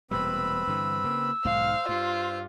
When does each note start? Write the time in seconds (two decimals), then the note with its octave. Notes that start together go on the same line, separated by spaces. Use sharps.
0.11 E1 A#2 G3 C4 B4 B5 E6
0.67 G2 D3 E3
1.04 C#3 A#3
1.45 B1 G#2 D#3 C5 F5
1.89 G2 F4